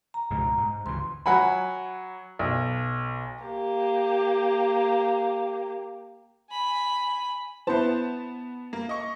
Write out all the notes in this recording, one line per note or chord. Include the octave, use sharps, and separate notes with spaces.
A#5
C#2 G#2 B2
G#2
D2 C#3 E3 C6
F#3 F#5 G#5 B5
B1
A#3 G4
G#5 B5
B3 E4 B4 C5 A5
A#3
D#5 C#6